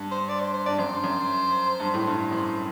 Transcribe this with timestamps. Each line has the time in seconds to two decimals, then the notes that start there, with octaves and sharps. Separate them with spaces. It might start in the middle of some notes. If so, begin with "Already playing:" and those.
Already playing: G2
0.11 C5
0.29 D5
0.40 C5
0.53 C5
0.66 G2 D5
0.78 F#2 C5
1.04 F#2
1.80 G2
1.94 A2
2.07 G2
2.31 F#2 C5